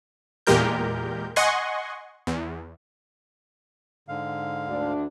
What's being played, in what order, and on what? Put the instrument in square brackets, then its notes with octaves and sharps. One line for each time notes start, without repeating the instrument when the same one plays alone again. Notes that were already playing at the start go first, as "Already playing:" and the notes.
[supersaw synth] E2 A#2 G#3 G4 A#4 G6
D#5 F#5 G#5 C6 C#6
E2
[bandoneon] G#2 D3 F5
[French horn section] D2 D4